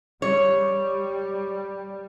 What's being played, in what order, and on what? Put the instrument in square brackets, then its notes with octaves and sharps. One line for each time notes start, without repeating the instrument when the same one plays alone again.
[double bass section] G3 [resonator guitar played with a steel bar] C#5